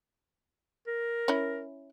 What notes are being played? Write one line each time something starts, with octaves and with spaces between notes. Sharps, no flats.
A#4
C#4 E4